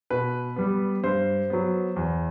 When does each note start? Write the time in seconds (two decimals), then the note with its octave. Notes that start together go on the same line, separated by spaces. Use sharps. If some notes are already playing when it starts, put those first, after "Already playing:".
0.10 B2 B4
0.56 G3 B3
1.04 G2 C5
1.50 F#3 B3
1.96 E2